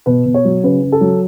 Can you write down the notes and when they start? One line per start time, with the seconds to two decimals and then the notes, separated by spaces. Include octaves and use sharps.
0.06 B2 B4
0.26 B2
0.34 C#5
0.45 F#3
0.63 C#3 B4
0.83 C#3
0.92 A4
1.01 F#3